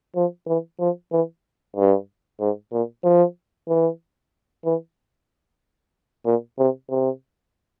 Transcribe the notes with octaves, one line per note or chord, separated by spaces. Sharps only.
F3
E3
F3
E3
G2
G#2
A#2
F3
E3
E3
A#2
C3
C3